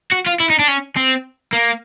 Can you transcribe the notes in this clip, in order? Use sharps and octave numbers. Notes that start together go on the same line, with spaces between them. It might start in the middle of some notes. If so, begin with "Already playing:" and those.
F#4
F4
E4
D#4
D4
C#4
C4
A#3